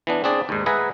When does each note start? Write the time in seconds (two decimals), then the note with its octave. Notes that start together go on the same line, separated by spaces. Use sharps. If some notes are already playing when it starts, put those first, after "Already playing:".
0.07 E3 B3 D4
0.24 C4 D4 G#4 D5
0.49 D#2 G#2
0.66 G#4 B4 E5 F#5 G#5 A#5